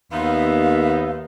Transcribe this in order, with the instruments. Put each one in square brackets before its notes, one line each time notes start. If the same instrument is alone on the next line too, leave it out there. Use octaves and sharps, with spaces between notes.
[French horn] D#2 [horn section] B3 D#4 E5 [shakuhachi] F5